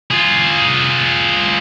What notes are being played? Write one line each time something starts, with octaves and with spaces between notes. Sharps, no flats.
F4 G#4